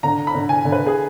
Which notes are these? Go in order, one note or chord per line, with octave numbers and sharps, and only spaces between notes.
D3 A#5
B5
D3
G#5
D3
B4
G#4